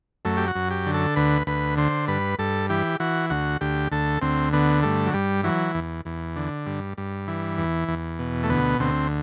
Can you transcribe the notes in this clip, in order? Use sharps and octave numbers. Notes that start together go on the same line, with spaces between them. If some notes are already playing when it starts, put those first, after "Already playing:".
F#2 A3
G4
F#4
F#2
G4
D3
A4
D2 B4
D2 B4
D3 C5
G2 B4
G2 A4
E3 G4
E3 F#4
D2 F#4
D2 G4
D2 A4
D2 C4
D3 B3
G2 A3
F#3
G2 G3
E3 F#3
E2
E2
D3
G2
G2
E3
E2
E2
B2
A3
D2 B3
D2 C4